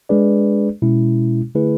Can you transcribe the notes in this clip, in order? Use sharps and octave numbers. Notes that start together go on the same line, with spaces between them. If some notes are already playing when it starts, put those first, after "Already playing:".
G#3 D4 G#4 B4 D5
B2 G#3 C#4 E4
D3 A3 E4 G#4 B4